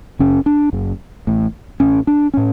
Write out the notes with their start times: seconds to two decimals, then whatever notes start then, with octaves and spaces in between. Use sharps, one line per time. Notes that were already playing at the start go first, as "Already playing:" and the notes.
0.19 F#1 F#2 C#3 C#4
0.46 D4
0.73 F#1 F#2 C#3
1.27 A1 A2
1.80 A1 A2 C#4
2.07 D4
2.34 A2 C#4